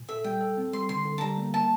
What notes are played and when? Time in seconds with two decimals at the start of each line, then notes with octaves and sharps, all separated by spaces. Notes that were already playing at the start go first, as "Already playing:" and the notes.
Already playing: A#2
0.09 A4 E5
0.24 G3 G5
0.41 A4
0.57 C4
0.73 G3 C6
0.89 D3 C6
1.05 D3
1.18 A5
1.21 G3 A#5
1.38 A#3
1.54 A#3 A5